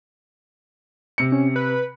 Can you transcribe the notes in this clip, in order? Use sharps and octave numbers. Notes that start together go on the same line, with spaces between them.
C3 C#7
C#4
B4